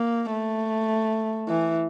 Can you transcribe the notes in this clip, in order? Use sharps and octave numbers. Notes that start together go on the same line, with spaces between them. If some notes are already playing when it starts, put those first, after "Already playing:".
Already playing: A#3
A3
E3